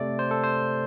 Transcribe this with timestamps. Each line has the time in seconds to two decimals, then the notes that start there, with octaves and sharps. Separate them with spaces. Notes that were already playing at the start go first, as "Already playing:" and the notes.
Already playing: C3 A3 D5
0.19 C5
0.31 A4
0.44 C5